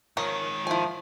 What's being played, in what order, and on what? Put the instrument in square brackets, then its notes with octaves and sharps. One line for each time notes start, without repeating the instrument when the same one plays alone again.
[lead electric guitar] G#2 D#3 [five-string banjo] F3 A#4 C#5
[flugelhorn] F3 [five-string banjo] E4 G#5